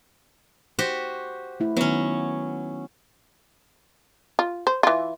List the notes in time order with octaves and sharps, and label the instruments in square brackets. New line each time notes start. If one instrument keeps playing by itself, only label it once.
[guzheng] F#4 G4 C5
[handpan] A3 E4
[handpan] D#3 B3 [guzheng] F#3 C#4
[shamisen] F4
C5
E3 F4